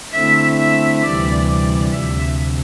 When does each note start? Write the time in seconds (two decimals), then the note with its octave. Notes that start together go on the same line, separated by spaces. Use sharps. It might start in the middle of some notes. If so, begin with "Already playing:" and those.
0.12 D3 A3 C4 E4 E5
0.57 E5
1.02 D2 C3 E3 G3 D5
1.47 D5
1.91 D2 C3 F3 E5